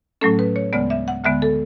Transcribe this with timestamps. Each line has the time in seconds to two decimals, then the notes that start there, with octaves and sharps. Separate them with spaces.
0.21 A2 F#3 A3 C#4 A4
0.39 B4
0.56 C#5
0.73 D2 C#3 G#3 B3 D5
0.90 E5
1.08 F#5
1.24 D2 D3 G#3 B3 E5
1.42 A4